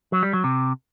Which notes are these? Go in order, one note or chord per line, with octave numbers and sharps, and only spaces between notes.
F#3
G3
F#3
C3